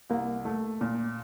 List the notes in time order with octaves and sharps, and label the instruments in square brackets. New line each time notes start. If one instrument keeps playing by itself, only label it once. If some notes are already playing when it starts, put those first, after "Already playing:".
[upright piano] C2 [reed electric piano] A#3
[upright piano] A3
A#2